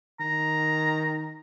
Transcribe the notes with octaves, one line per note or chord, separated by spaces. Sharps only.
D#3 A#5